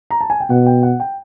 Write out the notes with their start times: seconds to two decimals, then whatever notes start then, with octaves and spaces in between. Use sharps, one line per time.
0.11 A#5
0.21 A5
0.30 G#5
0.40 G5
0.50 B2 F#5
0.66 G5
0.83 F#5
1.00 G5